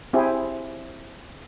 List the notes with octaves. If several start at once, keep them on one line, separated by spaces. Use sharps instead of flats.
C4 E4 G4 G#4